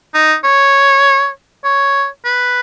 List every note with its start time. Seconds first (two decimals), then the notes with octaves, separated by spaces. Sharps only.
0.14 D#4
0.44 C#5
1.64 C#5
2.25 B4